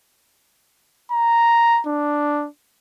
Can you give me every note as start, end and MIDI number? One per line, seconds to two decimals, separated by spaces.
1.12 1.81 82
1.86 2.47 62